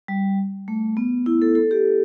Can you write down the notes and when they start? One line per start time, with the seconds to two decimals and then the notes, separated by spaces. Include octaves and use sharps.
0.08 G3
0.68 A3
0.97 B3
1.26 E4
1.42 A4
1.55 A4
1.71 G4